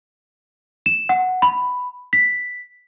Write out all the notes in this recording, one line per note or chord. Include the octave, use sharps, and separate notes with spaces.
E7
F#5
B5
B6